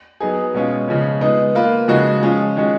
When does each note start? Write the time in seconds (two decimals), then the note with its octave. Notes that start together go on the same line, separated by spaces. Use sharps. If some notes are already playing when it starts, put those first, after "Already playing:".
0.20 F#3 B3 D#4 G#4
0.54 B2 G#3 C#4 F4
0.88 C#3 F3 G#3 C#4
1.21 G#3 B3 D#4
1.55 A#3 F4 B4
1.88 C#3 F3 G#3 D#4 F#4
2.22 F3 G#3 C#4 F4
2.56 D#3 G#3 C#4 F#4